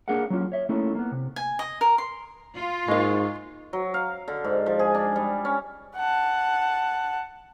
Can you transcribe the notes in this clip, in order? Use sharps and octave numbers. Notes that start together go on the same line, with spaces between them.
A#3 D4 G#4 A#4 F5 F#5
F#3 A#3 C#4 F4
C#5 E5
A3 A#3 C#4 D#4 E4 A4
A#3 B3
C3
G#5
D#5
A#4
C6
F4
G#2 G#3 A#3 D#5 C#6
F#3
F5
D3
G#2
F3
G#4
D4
G3
C#4
F#5 A5